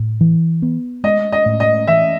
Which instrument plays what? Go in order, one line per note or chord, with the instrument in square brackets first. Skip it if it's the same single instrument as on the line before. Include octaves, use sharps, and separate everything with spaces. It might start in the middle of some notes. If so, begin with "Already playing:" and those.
Already playing: [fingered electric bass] A2
E3
B3
[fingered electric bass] G#3 [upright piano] D#5
[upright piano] D#5
[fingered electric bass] A2
[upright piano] D#5
[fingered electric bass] E3 [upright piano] E5